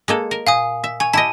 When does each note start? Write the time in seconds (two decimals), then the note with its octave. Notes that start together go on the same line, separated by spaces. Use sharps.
0.08 G#3 A#3 A4
0.31 A#4
0.47 A#2 F5 G#5 D#6
0.84 E5
1.00 C#5 G#5
1.13 E4 G4 D#5 A5